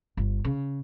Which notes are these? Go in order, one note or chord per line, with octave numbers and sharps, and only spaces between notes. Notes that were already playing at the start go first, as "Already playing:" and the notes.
G1
C#3